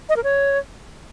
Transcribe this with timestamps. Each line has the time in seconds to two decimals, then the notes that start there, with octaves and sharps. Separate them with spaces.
0.09 D#5
0.16 A#4
0.24 C#5